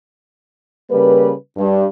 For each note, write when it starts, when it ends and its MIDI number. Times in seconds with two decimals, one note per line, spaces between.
0.90 1.32 49
0.90 1.32 55
0.90 1.32 58
0.90 1.32 71
1.57 1.85 43